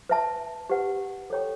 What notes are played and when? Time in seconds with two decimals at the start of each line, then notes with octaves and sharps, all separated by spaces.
0.09 B4 E5 A5
0.70 G4 B4 F#5
1.30 A4 C#5 G5 C#6